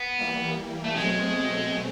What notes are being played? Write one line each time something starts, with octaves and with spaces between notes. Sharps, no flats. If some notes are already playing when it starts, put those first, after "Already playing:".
Already playing: B3
E3 G3 A#3
A3
B2 F#3 G#3 A3 C4